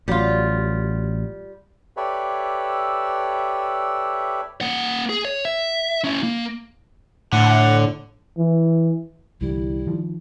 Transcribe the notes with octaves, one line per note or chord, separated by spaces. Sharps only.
A1 F#3 G3 F4
G4 A4 B4 C#5 D5 E5
A#3 F#5
G#4
C#5
E5
C#4 E4
A#3
A2 D3 F#5
E3
C2 D3 E3 G3 E4
D#3 F3